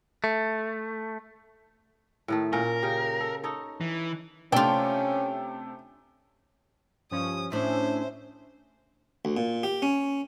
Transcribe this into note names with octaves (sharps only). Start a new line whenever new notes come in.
A3
A2 D#3 A3
A#2 C#4 A#4
C#3 G4
A4
D#4 A4 C#5
E3
C3 A3 C#4 D4 F4 G5
G2 F3 C#4 D#6
A2 C#4 D4 C5 E5
D2
A#2
G4
C#4